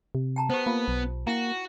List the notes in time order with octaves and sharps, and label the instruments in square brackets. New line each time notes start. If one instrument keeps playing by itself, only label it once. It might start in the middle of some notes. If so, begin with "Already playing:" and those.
[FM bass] C3
[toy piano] G5 A5 A#5
[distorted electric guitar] B3 [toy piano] G4 C5
[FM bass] A#3 [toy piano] F4
[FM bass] B1
[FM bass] A#3 [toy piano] E4 G5 [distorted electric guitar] F#4